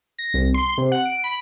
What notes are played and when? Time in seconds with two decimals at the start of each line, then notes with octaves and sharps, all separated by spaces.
0.19 A#6
0.34 C2
0.54 C6
0.78 C3
0.92 F#5
1.05 D7
1.24 B5